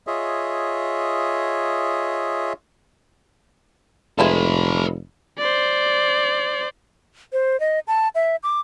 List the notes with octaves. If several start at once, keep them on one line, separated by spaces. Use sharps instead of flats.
F4 G#4 C#5 D#5 E5
F1 G#3 E4 F4 A4 B4
C5 D5
C5
D#5
A5
E5
D6